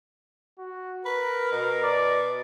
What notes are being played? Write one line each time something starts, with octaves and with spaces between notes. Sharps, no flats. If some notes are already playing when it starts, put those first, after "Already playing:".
F#4
A#4 B4
B2
D5